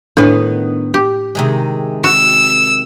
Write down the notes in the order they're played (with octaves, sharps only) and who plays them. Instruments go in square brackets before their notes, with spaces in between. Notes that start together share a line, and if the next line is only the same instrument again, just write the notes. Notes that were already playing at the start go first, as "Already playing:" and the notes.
[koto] A2 [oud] D#3 B3 B4 [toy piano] D4
[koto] G4
[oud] C3 D#3 G#3
[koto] F#4 [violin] E6